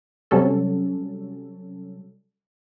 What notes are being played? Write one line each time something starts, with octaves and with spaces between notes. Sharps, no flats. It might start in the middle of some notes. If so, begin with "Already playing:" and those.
C3 F#3 G3 C#4 A4